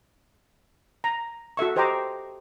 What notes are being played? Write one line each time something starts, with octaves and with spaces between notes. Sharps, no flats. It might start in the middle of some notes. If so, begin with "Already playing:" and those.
A#5
F#4 A4 E5 C#6
G4 C5 D#5 G5 A#5 D6